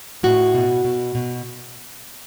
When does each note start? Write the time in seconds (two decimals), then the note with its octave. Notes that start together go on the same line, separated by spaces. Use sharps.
0.23 A2 F#4
0.54 B2
0.84 B2
1.15 B2